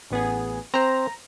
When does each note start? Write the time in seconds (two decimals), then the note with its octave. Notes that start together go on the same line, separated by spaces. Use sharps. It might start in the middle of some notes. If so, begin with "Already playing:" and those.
0.11 A1 B3 G#4
0.74 C4 C5 A#5